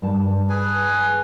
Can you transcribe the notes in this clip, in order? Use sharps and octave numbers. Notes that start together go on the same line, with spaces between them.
G2 A5
G#4 B4 G#5